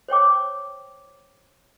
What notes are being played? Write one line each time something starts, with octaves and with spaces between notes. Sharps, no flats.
C5 C#5 G5 D6